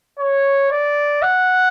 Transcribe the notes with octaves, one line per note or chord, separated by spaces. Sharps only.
C#5
D5
F#5